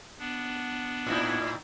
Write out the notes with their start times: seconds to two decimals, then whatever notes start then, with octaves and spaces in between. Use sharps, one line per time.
0.19 B3 D4
1.06 A2 D#4 E4